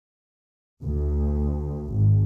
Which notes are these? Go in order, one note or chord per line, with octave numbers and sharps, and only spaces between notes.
D2
G#1